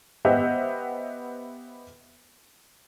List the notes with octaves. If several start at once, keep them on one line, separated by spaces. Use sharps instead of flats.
B3 G4 C5 D#5 E5 F#5